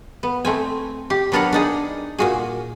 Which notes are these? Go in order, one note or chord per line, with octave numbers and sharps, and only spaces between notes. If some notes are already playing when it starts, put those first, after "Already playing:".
B3
A3 C4 G#5
G4
F#3 B3 D4 A#4 C#5 F#5
D4 D#4 G#4
A#2 F#4 G#4